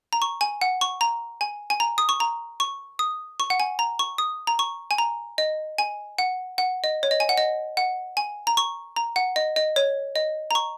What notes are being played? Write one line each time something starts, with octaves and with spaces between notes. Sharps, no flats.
A#5
C#6
G#5
F#5
C#6
A#5
G#5
G#5
A#5
D#6
C#6
A#5
C#6
D#6
C#6
F#5
G#5
A#5
C#6
D#6
A#5
C#6
G#5
A#5
D#5
G#5
F#5
F#5
D#5
C#5
D#5
G#5
F#5
D#5
F#5
G#5
A#5
C#6
A#5
F#5
D#5
D#5
C#5
D#5
A#5
C#6